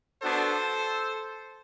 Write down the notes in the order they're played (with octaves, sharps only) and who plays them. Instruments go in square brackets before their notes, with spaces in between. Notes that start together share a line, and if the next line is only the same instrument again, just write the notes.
[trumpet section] B3 D4 F#4 A4 C5